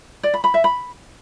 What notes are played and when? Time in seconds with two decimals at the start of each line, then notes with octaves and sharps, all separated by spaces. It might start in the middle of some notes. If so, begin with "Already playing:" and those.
0.23 D5
0.34 B5
0.44 B5
0.54 E5
0.64 B5